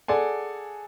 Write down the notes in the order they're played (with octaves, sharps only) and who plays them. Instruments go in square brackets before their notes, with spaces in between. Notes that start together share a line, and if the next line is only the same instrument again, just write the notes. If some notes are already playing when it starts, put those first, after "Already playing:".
[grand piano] G#4 A4 D5 F#5 G#5